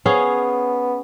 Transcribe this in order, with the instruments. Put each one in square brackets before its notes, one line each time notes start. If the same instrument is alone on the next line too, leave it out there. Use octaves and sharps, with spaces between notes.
[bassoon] B3 [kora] C#4 G#4 F5